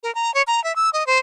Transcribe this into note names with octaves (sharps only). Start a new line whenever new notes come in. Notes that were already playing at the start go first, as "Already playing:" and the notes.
A#4
A#5
C#5
A#5
E5
E6
D#5
C5